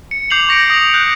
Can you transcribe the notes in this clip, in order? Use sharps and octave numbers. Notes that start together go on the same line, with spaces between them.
C#7
D6 G6 C7 F7 F#7
C#6 A#6 C#7 D7
D#6 A#6 F7
F#6 G6